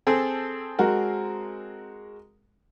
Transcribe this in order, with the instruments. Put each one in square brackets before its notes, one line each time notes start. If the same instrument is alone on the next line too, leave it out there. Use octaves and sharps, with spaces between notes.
[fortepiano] C4 G#4 A4
[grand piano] G#3 F#4 A#4